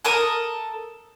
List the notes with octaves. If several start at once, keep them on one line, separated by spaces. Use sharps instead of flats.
A4 A#4 D#6